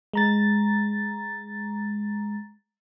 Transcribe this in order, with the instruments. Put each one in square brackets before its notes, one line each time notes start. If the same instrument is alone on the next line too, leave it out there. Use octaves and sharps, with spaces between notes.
[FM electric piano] G#3 A#5 A6